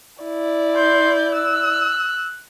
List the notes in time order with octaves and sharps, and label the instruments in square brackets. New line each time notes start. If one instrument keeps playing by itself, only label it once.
[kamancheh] E4 D5
[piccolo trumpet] C6 [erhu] G6
[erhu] E6 [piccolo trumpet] F#6